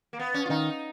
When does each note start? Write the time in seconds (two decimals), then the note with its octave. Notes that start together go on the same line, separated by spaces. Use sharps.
0.13 A#3
0.19 B3
0.34 C#4
0.46 F4
0.50 D#3 D#4